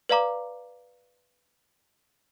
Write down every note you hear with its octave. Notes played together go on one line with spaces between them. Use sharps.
B4 D5 F5 A#5 D6